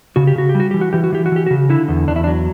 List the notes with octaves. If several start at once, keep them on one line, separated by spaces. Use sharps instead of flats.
C#3 F#4
G4
C#3 F#4
G4
G3
F#4
E3 G4
F#4
E3 G4
F#4
E3 G4
F#4
E3 G4
F#4
C#3
D3 E4
E2
E2 D4
E4
D4
F#3